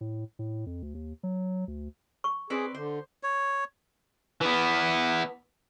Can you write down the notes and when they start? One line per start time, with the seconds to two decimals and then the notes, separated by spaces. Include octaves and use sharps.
0.01 A2
0.39 A2
0.66 F2
0.82 D2
0.95 D#2
1.23 F#3
1.68 D2
2.24 C#6
2.50 C4 G#4 B4 D5
2.75 D3 C5
3.23 C#5
4.41 E3 B3